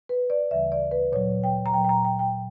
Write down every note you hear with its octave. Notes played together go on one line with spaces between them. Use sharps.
B4
D5
D2 C#3 E3 G3 E5
D5
B4
A#2 F#3 C#5
G5
A#5
A#2 F#3 G5
G5
A#5
G5
G5